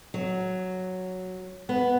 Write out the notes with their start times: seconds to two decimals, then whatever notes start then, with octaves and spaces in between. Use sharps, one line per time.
0.14 F#3
1.69 B3